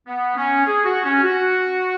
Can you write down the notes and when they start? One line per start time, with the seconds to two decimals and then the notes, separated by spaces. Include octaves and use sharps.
0.07 B3
0.36 C#4
0.65 G#4
0.84 F#4
1.03 C#4
1.22 F#4